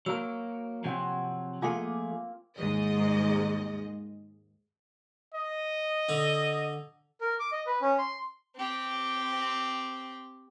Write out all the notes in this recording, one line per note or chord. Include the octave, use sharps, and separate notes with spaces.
F#3 A#3 F#4 A#4 E6
C3 F3 F#3 C4 F#5 G#5
F3 A3 A#3 F4 G#4 F#5 C6
D#2 G#2 G#3 D#5
D#5
D3
A#4
D6
D#5
B4
C#4
C6
C4 G4